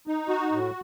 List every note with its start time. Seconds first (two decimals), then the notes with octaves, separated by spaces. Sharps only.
0.07 D#4
0.29 F#4
0.52 A2